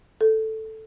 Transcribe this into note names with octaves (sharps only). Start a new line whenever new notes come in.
A4